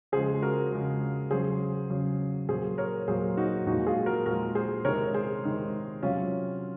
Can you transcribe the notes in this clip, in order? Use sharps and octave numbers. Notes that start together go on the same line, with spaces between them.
C#3 F3 G#3 G#4 C5
F#4 A#4
C#3 F3 G#3
C#3 F#3 G#4 C5
C#3 F#3
A#2 F#3 G#4 C5
A#4 C#5
A#2 F#3 G#4 C5
D#4 F#4
A#2 F3 G#3 D#4 F#4
F4 G#4
F#4 A#4
A#2 F3 G#3 F#4 A#4
G#4 C5
C3 D#3 G#3 A#4 C#5
G#4 C5
C3 D#3 G#3
C3 F#3 C#4 F4